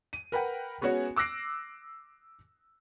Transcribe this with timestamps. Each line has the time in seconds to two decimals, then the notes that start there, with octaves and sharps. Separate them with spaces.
0.13 D#7
0.32 A#4 B4 F#5 G5
0.81 G#3 B3 C#4 F#4 C#5
1.16 D6 E6 F#6 A#6 C7 D7